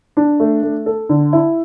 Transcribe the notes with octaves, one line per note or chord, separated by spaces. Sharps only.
D4
A3
A3
A4
D3
E4